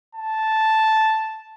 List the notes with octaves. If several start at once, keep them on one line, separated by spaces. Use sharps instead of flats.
A5